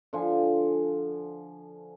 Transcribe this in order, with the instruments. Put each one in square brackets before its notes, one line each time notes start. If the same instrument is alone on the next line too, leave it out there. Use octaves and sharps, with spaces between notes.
[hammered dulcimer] D3 F3 G#5